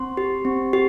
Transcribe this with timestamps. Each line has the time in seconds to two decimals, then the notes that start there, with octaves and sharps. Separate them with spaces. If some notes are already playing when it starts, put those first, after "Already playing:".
Already playing: C4 C6
0.17 G4
0.45 C4
0.73 G4